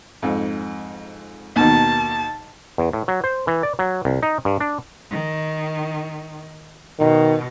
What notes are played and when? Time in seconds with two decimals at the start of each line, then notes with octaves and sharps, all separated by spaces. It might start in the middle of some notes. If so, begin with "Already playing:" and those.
0.22 F2 G#2
1.56 D#2 B2 D#3 A5
2.78 E2
2.93 A2
3.08 F#3
3.24 C5
3.47 E3
3.63 D5
3.79 F#3
4.05 C2
4.23 D#4
4.45 G2
4.60 D4
5.10 D#3
6.99 B2 D#3